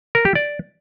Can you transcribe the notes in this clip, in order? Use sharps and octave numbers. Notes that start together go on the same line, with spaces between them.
A#4
G4
D5